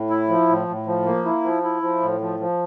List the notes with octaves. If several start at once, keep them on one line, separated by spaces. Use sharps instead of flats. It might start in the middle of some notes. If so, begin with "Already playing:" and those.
Already playing: A2
E4
F3
A2
A2
F3
A#3
E4
F3
E4
F3
A2
F3
F3